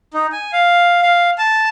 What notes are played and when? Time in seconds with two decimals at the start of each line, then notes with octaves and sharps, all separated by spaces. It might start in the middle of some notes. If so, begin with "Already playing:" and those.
0.14 D#4
0.32 G#5
0.53 F5
1.02 F5
1.38 A5